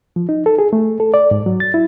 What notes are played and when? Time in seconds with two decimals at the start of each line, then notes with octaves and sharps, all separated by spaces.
0.16 F3
0.29 D#4
0.46 A4
0.59 G#4
0.73 A3
1.00 A4
1.14 D5
1.31 G#2
1.46 F#3
1.60 A6
1.74 E4